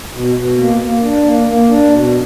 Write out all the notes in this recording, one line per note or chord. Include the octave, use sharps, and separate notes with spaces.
B2
B2
A#3
A#3
D4
A#3
A#3
D4
B2